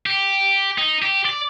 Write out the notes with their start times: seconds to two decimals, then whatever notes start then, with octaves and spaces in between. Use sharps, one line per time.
0.06 G4
0.78 D#4
1.02 G4
1.25 D5